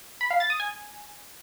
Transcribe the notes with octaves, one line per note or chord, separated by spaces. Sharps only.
B5
F5
A6
D#6
G#5